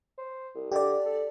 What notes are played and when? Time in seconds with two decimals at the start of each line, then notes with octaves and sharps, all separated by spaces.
0.18 C5
0.55 C2
0.72 D3 G4 D5
1.05 A4